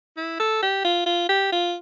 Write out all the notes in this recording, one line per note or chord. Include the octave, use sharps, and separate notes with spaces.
E4
A4
G4
F4
F4
G4
F4